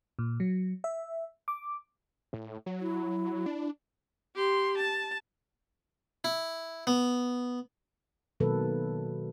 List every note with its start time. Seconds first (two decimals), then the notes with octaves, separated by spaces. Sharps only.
0.19 A#2
0.40 F#3
0.84 E5
1.48 D6
2.33 A2
2.66 F#3
2.81 E4
3.46 D4
4.35 G4 C6
4.78 A5
6.24 E4
6.87 B3
8.40 B2 D#3 F#3 A#3 A4 B4